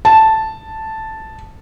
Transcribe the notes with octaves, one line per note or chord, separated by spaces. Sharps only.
A5